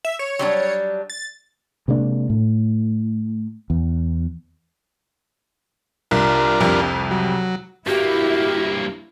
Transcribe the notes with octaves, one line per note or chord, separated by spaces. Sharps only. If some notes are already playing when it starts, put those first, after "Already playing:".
E5
C#5
F#3 G3 D4
A6
C3 G#3 A#3 D4
A2
E2
C2 D4 F4 A#4
C2 F2 C3
F#3
G2 A#3 E4 F#4 G4